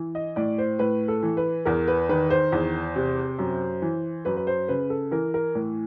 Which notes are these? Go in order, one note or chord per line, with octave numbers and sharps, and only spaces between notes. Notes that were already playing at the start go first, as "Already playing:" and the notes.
Already playing: E3
D#5
A2 D5
C5
A2 B4
A4
E3
B4
E2 A#4
B4
D#3 B4
C5
E2
C3
F#2
E3
F#2 B4
B4
C5
C#3 B4
A4
E3 A#4
A#4
A2